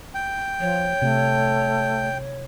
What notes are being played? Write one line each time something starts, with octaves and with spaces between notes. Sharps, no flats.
G5
F3 C#5
C3 A3